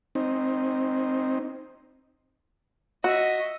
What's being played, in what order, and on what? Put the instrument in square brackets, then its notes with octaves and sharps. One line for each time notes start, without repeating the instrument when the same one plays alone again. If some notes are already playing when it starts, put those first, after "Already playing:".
[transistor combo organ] C4 D#4
[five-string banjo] F#4 [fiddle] D#5 E5